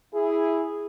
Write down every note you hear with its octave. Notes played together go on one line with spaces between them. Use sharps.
E4 G#4